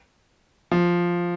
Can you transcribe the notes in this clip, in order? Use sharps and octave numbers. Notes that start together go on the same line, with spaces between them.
F3